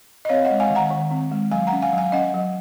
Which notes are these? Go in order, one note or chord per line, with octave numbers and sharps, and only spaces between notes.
D#5
C4 C#5 F5
D#5 F#5
G#3
F5 G#5
D#3
F#5 A#5
D#3
C4
G#3
F#3 F5 G#5
C#4 F#5 A#5
F5 G#5
F#3
F5 G#5
C#4 D#5 F#5
F#3